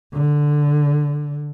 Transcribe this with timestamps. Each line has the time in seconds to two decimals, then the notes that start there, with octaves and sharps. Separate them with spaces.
0.14 D3